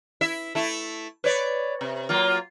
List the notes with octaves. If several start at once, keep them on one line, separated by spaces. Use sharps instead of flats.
E4 E5
A3 E4
B4 C#5 D5
C3
F#3 A#3 F4